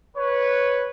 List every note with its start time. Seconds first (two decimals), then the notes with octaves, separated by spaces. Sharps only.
0.17 B4 C#5